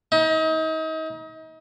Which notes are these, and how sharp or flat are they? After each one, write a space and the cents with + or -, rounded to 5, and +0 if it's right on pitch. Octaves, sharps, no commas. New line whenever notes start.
D#4 +35